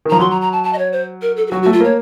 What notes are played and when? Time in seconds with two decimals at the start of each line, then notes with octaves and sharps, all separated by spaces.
0.05 D#3
0.10 F3 A#5
0.19 F#3 C6
0.31 A#5
0.41 A#5
0.52 A5
0.64 A5
0.73 D#5
0.79 C#5
0.92 C5
1.22 A#4
1.36 A4
1.47 A4
1.51 F#3 F#4
1.63 F#4
1.66 A3
1.73 F4
1.80 A#3 C#5